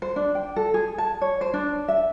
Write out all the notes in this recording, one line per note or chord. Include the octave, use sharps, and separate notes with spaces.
C5
D4
G5
A4
G#4
A5
C#5
C5
D4
E5